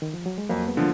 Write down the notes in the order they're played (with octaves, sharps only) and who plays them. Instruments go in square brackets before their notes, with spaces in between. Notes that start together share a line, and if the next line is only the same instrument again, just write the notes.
[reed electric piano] D#3
F3
F#3
G#3
[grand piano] F2 [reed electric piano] F#3 A#3
[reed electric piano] G#3 B3
[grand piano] D3 F3